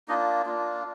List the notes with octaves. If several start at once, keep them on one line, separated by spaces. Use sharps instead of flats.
A#3 D4 D#4 F4 D#5
A#3 D4 F4